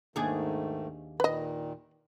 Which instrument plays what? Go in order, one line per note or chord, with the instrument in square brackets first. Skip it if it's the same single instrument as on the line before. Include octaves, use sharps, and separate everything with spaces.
[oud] D#2 D4 G#4 [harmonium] G#2 D#3 A3
[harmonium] A#2 D#3 [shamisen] B4 D#5